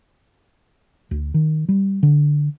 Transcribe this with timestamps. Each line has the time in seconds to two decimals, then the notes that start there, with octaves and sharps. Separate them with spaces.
1.11 D2
1.34 D#3
1.69 G3
2.03 D3